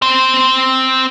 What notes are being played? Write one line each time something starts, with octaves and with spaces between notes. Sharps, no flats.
C4 C5